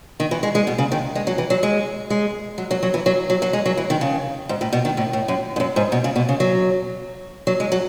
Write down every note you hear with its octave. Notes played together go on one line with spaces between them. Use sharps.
D#3
E3
G#3
G#3
B2
C#3
D#3
G#3
F#3
E3
F#3
G#3
G#3
F#3
F#3
F#3
E3
F#3
F#3
F#3
G#3
F#3
E3
D#3
C#3
G#2
A2
B2
D#3
A2
A2
F#2
G#2
F#2
G#2
B2
C#3
B2
C#3
F#3
F#3
G#3
F#3